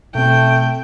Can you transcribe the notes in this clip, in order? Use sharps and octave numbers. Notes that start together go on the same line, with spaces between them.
B2 A3 C4 G5